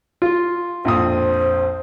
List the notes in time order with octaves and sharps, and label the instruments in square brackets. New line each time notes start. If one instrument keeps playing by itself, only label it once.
[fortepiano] F4
[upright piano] A#1 F2 D#6 [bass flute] C5